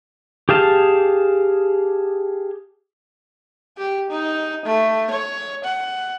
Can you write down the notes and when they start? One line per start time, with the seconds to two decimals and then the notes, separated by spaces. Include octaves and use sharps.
0.49 G4 G#4 F5 A5
3.78 G4
4.10 D#4
4.65 A3
5.10 C#5
5.64 F#5